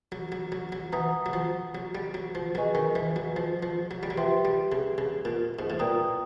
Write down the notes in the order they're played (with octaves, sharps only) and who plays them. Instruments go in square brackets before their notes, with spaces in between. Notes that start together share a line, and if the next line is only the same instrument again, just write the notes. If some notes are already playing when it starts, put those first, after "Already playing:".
[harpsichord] F#3
F#3
F#3
F#3
[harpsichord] E3 [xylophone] F#5 A#5 D#6
[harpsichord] F#3
F3
F#3
G3
F#3
F3
[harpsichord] F#3 [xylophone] G#4 B4 D#5 G#5 C#6
[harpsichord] D#3
E3
F#3
F3
F3
F#3
G3
F#3
[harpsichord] F3 [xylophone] G4 B4 E5 G5 C6
[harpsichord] G3
C#3
C#3
A#2
G#2
A2
[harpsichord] A#2 [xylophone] B4 D5 G5 A#5 D#6